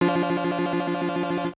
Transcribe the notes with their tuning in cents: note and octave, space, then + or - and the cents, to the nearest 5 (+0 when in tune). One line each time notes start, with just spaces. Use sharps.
F3 +0 D4 -40 F4 +0